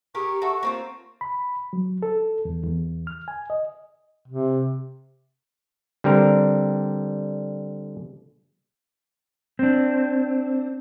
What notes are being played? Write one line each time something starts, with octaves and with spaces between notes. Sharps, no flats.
G4 G#4 A#4 C#6
F#4 A4 E5
A#3 C4 F4
B5
F#3
A4
E2
E2
F6
G#5
D#5
C3
D3 G3 C4 A#4
C4 D4